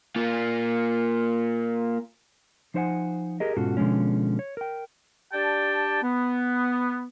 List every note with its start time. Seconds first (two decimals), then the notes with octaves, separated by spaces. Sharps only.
0.16 A#3 F4
2.74 F3 D#4 C5 C#5 F#5 G#5
3.40 G4 G#4 A#4 D#5
3.57 G#2 B2 C#4 F4 F#4 A4
3.77 B2 D3 F3 G#3 C#4
4.39 C#5
4.57 A#4 G5
5.33 D4 G4 D5 G5 A5
6.02 B3